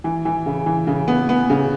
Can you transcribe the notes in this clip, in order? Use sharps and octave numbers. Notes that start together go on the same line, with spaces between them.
E3
E3
C#3
E3
C#3
B3
B3
C#3